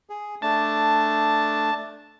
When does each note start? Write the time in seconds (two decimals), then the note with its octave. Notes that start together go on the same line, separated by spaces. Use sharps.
0.10 G#4
0.42 A3 D4 A5